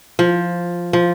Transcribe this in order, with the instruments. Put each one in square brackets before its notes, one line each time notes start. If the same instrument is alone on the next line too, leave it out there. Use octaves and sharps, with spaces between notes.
[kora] F3
F3